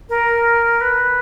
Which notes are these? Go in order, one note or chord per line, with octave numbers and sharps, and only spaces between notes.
A#4
B4